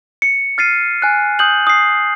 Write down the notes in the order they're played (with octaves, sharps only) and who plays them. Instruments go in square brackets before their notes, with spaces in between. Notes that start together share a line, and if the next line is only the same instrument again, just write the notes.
[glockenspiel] C#7
F6 A6 C7 D#7
G#5 F#6
D#6 G6 F#7
D#6 C7